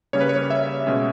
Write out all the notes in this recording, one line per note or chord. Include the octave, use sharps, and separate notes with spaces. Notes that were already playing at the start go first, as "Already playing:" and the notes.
C#3 G3 A#3 C#4 C#5
B4
C#5
E5
B2 G#3 C#4